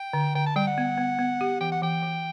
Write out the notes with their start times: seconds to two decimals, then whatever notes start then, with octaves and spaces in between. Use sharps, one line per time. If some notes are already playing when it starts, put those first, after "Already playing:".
Already playing: G5
0.13 D3
0.35 D3 G5
0.46 A5
0.56 G3 G5
0.67 F#5
0.78 B3
0.98 B3
1.19 B3
1.41 G4
1.61 E3 G5
1.72 F#5
1.82 E3 G5
2.03 E3